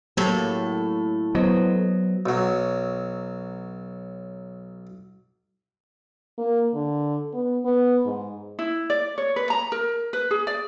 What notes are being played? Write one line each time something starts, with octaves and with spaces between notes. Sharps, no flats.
A2 F#3 A#3 G4 A4
F#3 B3 C5 D#5
B1 F#3
A#3
D3
B3
B3
G#2
E4
D5
C#5
B4
A#5
A#4
B4
G#4
D5